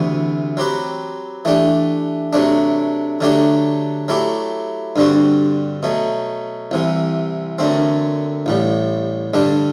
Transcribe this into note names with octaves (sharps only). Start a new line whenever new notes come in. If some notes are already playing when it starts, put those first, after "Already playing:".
Already playing: D2 C3 E3 B3 F#4
F#3 C4 G4 B4
E3 A3 D4 G4
C3 F#3 A3 D4
D3 F#3 A3 D4 G4
F#3 A3 E4 G4
G2 D3 G3 C4 F#4
B2 F#3 A3
C2 C3 E3
F#2 D3 A3 C4
A1 A2 G3
G2 D3 G3 D4